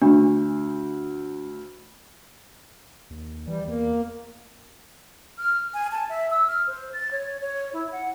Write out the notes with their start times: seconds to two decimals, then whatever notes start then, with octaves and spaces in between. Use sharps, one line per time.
0.02 D2 D4
3.10 D#2
3.48 E3 G3
3.67 E2 A#3
5.39 F6
5.74 G#5
5.92 A5
6.09 E5
6.31 E6
6.48 F6
6.67 C5
6.93 A6
7.11 C#5
7.41 C#5
7.73 E4
7.92 F#5